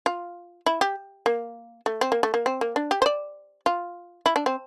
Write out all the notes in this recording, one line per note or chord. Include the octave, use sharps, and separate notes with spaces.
F4
E4
G4
A#3
A3
C4
A#3
A3
A#3
C4
A#3
D4
G4
C5
D5
F4
E4
D4
C4